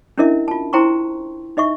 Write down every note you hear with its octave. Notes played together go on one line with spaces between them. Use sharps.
C#4 D4 E4 A#4 D#5 E5
F4 A5
E4 C5 G5 A#5 C6 C#6
D#4 D#5 E5 C#6